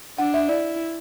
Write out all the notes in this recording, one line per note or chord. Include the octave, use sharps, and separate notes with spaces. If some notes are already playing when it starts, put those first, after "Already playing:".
D4 F#5
E5
E4 D5